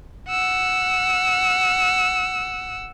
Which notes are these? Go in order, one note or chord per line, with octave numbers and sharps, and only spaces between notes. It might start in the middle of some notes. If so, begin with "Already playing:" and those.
F#5 E6